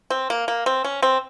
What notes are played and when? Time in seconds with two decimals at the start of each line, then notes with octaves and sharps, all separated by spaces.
0.10 C4
0.30 A#3
0.48 A#3
0.66 C4
0.84 C#4
1.02 C4